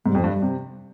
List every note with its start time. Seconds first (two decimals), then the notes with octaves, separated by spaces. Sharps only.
0.06 G#2 G3
0.15 F2
0.19 F3
0.24 G2
0.33 G3
0.42 C3